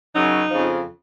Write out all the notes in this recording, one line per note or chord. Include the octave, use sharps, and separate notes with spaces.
F#2 C#3 F#3 D#4
F2 C#3 F3